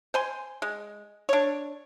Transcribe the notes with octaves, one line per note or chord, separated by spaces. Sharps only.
C5 G#5 C6
G#3
D4 C#5